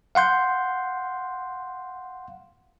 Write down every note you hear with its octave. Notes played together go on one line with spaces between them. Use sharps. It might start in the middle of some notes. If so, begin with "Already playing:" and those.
F5 F#5 C6 G6